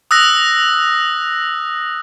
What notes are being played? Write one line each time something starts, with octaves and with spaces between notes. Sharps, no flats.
D#6 E6 F#6 A#6